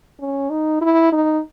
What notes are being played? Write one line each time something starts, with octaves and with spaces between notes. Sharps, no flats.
C#4
D#4
E4
D#4